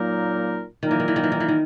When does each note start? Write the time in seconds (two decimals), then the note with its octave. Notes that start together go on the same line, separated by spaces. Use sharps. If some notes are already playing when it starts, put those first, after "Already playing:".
Already playing: A#2 F#3 A#3 D#4 A#4
0.83 A#2 D#3 F#3 A#3 D#4 A#4
0.91 E3
1.00 D#3
1.08 E3
1.16 D#3
1.23 E3
1.32 D#3
1.40 E3
1.48 D#3